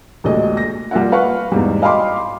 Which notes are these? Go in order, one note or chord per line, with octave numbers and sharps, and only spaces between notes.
A1 D2 A#2 D3 G#3 D#5
A#6
G3 A#3 F4 E5 F#5
B4 F5 F#5 C#6
E2 G#2 G3
D#5 F5 G5 B5 C6 D6